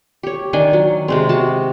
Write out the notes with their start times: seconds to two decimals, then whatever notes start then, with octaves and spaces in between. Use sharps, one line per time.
0.23 G4 C#5
0.53 D#3 D4 G5 G#5
0.73 F#3
1.08 C3 G#3 C4
1.29 F#4 A5